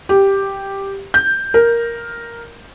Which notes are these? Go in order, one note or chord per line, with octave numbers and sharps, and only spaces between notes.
G4
G6
A#4